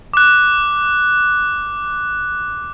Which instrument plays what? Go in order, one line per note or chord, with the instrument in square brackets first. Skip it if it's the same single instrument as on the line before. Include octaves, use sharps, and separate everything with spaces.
[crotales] D6 F#6